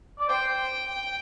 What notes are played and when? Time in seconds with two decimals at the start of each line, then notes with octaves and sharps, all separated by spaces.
0.18 D5
0.28 C5 G5